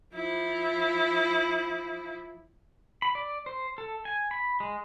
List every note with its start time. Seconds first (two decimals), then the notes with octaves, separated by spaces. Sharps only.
0.14 F3 E4
3.02 B5
3.15 D5
3.46 C5
3.78 A4
4.05 G#5
4.31 B5
4.60 G#3